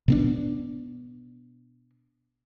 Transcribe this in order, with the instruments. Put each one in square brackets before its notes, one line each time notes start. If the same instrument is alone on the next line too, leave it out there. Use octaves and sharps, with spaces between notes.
[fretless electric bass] B2 B3 D4